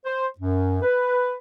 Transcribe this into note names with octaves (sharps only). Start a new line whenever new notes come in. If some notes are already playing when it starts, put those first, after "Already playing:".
C5
F#2
B4